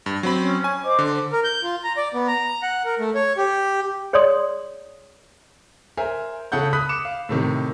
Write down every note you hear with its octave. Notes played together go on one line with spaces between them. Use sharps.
G2
F#3 C4 B5
C#4 C#5
G#5
C5 D#5 D6
D3
A#4
G6
F4
A#5
D5
B3
A#5
F#5
A#4
A3
C#5
G4
G#4 C#5 D5 C6 D#6
A#4 C5 E5 G#5
C#3 A4 F#5 G6
B5 D#6 F#6 B6
D6 C#7 E7
F5
A2 C3 D#3